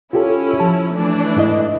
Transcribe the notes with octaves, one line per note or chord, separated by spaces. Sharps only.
C#4 E4 F4 G4 A4
F3 A5
E3 A3 D4
G#2 E4 D#5